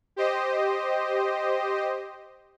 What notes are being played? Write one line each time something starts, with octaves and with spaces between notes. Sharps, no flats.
G4 C5 D#5